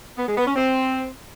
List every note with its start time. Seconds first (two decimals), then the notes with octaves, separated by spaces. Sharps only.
0.18 B3
0.27 G#3
0.36 B3
0.46 C#4
0.55 C4